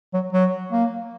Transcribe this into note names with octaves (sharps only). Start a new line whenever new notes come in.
F#3
F#3
A#3